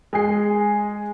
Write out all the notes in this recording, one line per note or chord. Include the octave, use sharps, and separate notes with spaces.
G#3 G#4 C7